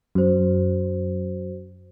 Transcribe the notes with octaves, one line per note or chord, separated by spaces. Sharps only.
F#2 F#4 C5